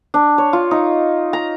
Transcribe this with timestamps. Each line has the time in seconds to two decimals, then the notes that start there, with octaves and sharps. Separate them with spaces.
0.14 D4
0.38 C#5
0.53 F4
0.71 D#4
1.33 A#5